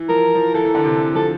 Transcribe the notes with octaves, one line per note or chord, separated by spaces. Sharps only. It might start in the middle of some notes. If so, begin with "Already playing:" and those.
Already playing: E3
F3 A#4
F3
E3 A4
E3
D3
C3
F3 A4